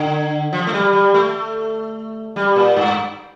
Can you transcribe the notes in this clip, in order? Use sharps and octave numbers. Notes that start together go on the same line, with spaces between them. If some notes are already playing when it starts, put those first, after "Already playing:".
Already playing: D3
F3
A3
G3
G3
A3
G3
A#2
G2